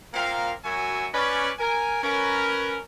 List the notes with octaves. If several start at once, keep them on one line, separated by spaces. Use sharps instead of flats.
A#2 A#3 C4 F4 A#4 F5
F#2 F#3 F#4 E5 G#5
C#4 B4 D5
A#4 G#5
C#4 A#4 B4